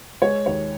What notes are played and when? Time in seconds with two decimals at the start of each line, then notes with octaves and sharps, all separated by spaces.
0.22 G#3 C#5
0.46 D#2 C#5